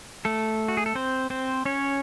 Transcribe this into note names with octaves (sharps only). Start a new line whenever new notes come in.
A3 A4
F#4
G#4
A4
C4 C5
C4 C5
C#4 C#5